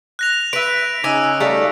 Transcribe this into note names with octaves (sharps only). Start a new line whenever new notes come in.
F#6 A#6 F7
B4 E5 D7
C#3 D#4 G#5 D6 E6
G3 A3 F5